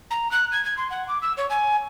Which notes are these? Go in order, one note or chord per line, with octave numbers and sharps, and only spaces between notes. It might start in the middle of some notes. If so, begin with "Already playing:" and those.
A#5
F#6
G#6
G#6
C6
F#5
D6
E6
C#5
G#5